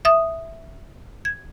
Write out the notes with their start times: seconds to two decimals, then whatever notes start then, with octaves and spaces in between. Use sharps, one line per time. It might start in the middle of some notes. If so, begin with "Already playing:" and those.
0.05 E5 D#6
1.25 G#6